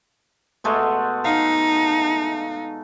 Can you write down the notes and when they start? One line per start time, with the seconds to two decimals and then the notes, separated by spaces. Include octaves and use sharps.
0.64 B2 G#3 A3
1.25 D#4 F5